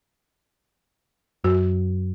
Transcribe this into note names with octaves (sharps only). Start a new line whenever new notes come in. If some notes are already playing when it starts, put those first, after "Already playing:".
F#2 F#4